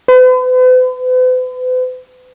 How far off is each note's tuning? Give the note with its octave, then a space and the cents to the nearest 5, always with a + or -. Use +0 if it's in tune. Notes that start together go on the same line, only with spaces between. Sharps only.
B4 +45